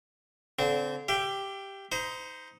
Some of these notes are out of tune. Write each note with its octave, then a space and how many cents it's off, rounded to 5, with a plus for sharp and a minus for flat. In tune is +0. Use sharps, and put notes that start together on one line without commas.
D3 -40 C4 -25
G4 +0 E5 +40
D#4 +15 C5 -30